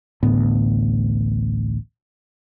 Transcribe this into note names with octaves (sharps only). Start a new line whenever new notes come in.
A1 D2 A2 B3